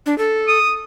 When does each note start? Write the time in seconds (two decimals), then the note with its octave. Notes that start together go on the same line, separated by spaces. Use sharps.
0.06 D4
0.18 A4
0.48 D#6